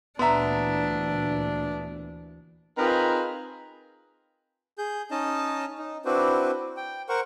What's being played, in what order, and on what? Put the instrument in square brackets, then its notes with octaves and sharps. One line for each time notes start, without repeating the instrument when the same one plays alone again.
[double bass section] D2 A#2 E3 [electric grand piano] B3 E5 [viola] D4 [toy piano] A#5 C6
[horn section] C4 D#4 F4 G#4 A#4 B4
[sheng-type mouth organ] G#4 G6
C#4 D#4 D#5 A5
D#4
C4 D4 E4 F#4 B4 C5
G5
A#4 C5 F#5 C#6